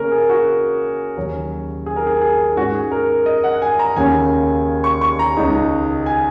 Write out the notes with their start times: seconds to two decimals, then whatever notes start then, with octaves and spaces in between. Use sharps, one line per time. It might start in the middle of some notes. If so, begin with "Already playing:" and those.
Already playing: C#3 A#3 C#4 A#4
0.12 G#4
0.29 F#4
1.17 D#2 C#3 F#3 C#4
1.86 G#4
1.96 A#4
2.07 G#4
2.21 G#4
2.56 G#2 G#3 C#4 F#4
2.75 G#4
2.91 A#4
3.26 D#5
3.44 F#5
3.54 F#5
3.62 G#5
3.79 A#5
3.96 D#2 C#3 A#3 C#4 G#5
4.84 C#6
5.01 C#6
5.19 A#5
5.37 C#2 C#3 G#3 D#4
6.06 G#5